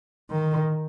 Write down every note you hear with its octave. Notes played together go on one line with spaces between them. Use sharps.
D#3